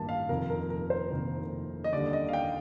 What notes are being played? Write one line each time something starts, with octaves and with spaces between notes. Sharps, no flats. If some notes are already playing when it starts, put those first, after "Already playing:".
Already playing: A1 G2 D#3 A#3 D4 A5
F5
F1 F2 D#3 A#3 A#4
A#4
A#4
C5
F1 F2 D#3 A#3
D#5
D#2 D3 G3 D5
D#5
F5
G5